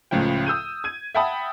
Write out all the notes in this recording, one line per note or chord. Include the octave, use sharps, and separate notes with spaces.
C#2 A2 C#3 F3 G5
D#6 E6 G6 D#7
G#6 D#7
E5 F#5 G5 A5 B5 D#6